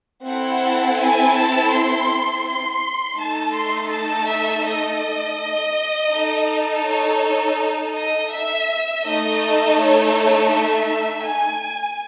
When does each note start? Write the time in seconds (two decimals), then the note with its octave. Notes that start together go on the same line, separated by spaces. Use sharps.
0.25 C4 E4 A4 F#5
0.99 G#5
1.36 A5
1.71 C6
2.45 C6
3.18 A3 D#4 A4 A5
3.54 C6
3.91 A5
4.27 E5
4.64 D#5
6.10 D#4 A4
6.84 C#5
7.93 D#5
8.30 E5
9.04 A3 D#4 A4 D#5
9.77 C#5
10.50 E5
11.23 G#5